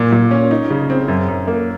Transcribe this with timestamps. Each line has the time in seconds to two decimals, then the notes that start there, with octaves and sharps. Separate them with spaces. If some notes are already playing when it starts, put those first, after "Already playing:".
Already playing: A#2
0.12 A#2
0.31 C#4
0.51 D#4
0.70 C#3
0.90 C4
1.08 F#2
1.28 F#2
1.47 A#3